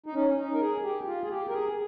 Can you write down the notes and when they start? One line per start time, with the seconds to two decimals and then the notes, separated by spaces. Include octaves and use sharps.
0.06 D#4
0.14 C#4
0.37 D#4
0.54 A#4
0.61 G#4
0.84 G4
1.06 F4
1.23 G#4
1.30 G4
1.49 A#4
1.52 G#4